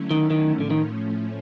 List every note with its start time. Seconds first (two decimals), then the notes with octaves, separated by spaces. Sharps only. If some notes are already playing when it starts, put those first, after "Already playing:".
Already playing: D3 F#3 A3 C#4 E4
0.11 D#3
0.30 D#3
0.51 A2 F3 A3 C#4
0.60 D3
0.70 D#3